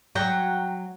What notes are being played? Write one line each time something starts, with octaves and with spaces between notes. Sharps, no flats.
F#3 G5 A#5